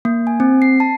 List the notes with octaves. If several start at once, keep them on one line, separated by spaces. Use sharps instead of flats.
A#3
G#5
C4
C7
A5